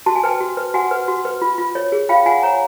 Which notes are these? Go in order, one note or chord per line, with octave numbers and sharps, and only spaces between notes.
F#4 A5
G#5
B4 G5 A5
F#4
B4
F#4 F#5 G#5
B4
F#4
B4
F4
F4
C#5
G#4
F4 F5 G5
F4 F#5 G#5
C#5 G#5 A#5